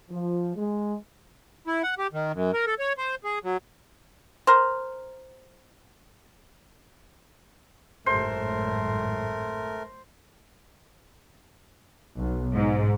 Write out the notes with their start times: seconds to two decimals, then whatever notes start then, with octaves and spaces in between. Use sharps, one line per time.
0.10 F3
0.56 G#3
1.67 E4
1.83 F#5
1.98 G4
2.13 D#3
2.33 F#2
2.53 A#4
2.66 A4
2.79 C#5
2.97 C5
3.24 G#4
3.44 F#3
4.47 A#4 C5
8.06 G#1 F#2 A2 A3 A#4 C5
12.18 B1
12.53 G#2